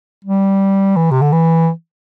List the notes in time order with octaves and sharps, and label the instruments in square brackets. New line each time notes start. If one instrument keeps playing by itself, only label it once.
[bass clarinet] G3
E3
C3
D3
E3